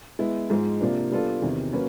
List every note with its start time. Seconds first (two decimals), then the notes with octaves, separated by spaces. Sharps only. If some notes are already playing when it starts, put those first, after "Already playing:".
0.19 G#3 B3 E4
0.50 G#2 F3 G#3
0.81 C3 F3 A#3 D4
1.11 G3 B3 D4 F4 A4
1.42 E2 C3 D#3
1.73 F#3 A#3 C#4 F#4 B4